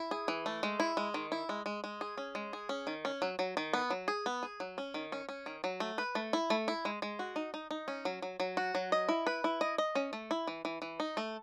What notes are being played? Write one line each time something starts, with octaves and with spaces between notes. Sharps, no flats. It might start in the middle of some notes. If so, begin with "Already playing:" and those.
Already playing: E4
G#4
E3
A3
G#3
E4
G#3
D#3
E4
G#3
G#3
G#3
G#4
C#4
G#3
G#4
C#4
D#3
C#4
F#3
F#3
D#3
B3
F#3
G#4
B3
G#4
F#3
C#4
D#3
C#4
C#4
D#3
F#3
A3
B4
A3
E4
A3
E4
G#3
G#3
F#4
D#4
D#4
D#4
C#4
F#3
F#3
F#3
F#4
F#3
D#5
E4
B4
E4
D#5
D#5
C#4
A3
E4
E3
E3
E3
D#4
A3